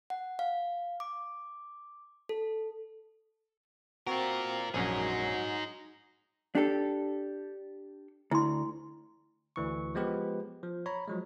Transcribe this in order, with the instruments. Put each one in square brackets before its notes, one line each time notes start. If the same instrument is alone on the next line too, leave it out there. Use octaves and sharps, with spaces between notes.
[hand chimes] F#5
F5
D6
A4
[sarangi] C4 [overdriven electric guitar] F4 A#4 [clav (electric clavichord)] F#4
[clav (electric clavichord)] A#1 F#2 C#4 [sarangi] F#3 [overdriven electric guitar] D#4 G#4
[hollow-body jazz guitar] D4 G4 A4
[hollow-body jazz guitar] D2 [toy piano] E4 C6
[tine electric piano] D2 E3 C#6
F3 G#3 B3 G4 B4
F3
C#5 A#5 B5
F3 F#3 G#3